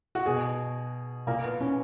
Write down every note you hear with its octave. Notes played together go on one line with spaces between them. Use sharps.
F#4
B2 G#4
A#2 A#3
B3
C#4